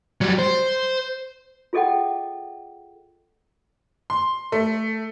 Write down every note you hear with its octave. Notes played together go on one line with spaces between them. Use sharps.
F#3 G3
C5
F4 G#4 A4 D#5 F#5 G5
C6
A3